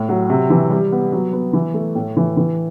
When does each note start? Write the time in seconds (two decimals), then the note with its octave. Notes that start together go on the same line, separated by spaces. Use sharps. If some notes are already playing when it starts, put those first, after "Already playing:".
Already playing: A2
0.09 F#3
0.30 C3
0.50 E3
0.70 G3
0.92 B3
1.12 F#3
1.33 B3
1.53 E3
1.74 A3
1.95 A2
2.17 E3
2.37 E3